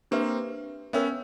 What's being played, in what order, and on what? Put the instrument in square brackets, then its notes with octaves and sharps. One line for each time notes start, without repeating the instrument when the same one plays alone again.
[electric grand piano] A#3 C4 [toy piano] D4 G4 B4 E5
[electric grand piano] B3 C#4 [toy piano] A#4 C#5 E5 G5